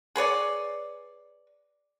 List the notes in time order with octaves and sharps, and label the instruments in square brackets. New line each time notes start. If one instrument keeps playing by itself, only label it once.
[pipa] G#4 B4 C#5 D5